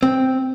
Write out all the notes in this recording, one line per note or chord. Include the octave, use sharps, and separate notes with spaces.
C4